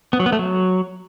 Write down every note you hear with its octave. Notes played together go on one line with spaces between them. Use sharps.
B3
F#3
B3
A3
F#3